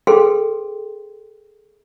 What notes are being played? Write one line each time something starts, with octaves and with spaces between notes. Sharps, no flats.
G#4 A4 B4 G5 C6